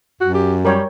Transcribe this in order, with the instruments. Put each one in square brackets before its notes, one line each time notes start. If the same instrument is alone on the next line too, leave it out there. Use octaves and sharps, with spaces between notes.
[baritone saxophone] F#2 [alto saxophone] F#4
[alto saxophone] G4
[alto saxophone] G3 [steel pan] A#4 C#5 G5